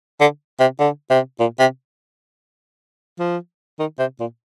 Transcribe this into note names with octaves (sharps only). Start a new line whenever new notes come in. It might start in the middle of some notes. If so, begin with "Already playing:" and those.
D3
C3
D3
C3
A#2
C3
F3
D#3
C3
A#2